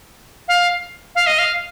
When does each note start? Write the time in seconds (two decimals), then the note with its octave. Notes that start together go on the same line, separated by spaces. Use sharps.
0.48 F5
1.15 F5
1.27 D#5
1.39 F5